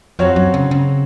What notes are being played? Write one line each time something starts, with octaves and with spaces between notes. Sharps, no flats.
F2 F#3 C4 F#4 C#5 F5
F#2
C#3
C#3